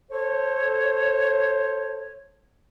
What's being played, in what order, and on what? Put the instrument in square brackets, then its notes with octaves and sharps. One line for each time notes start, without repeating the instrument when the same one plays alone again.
[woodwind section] A4 C5 C#5